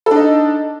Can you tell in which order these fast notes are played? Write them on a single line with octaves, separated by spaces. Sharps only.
A4 D4 D#4